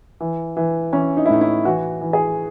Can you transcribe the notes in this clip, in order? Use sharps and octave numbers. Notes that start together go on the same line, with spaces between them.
E3
E3
E3 C#4
D#4
E4
A2 D#4
E4
E3 F#4
E3
G#4